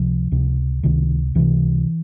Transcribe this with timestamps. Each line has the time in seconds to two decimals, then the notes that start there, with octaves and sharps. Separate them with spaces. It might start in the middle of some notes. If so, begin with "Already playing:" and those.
Already playing: C#2 C3 F3
0.32 C#2 C3
0.83 C#2 C3 D#3
1.35 C#2 C3 E3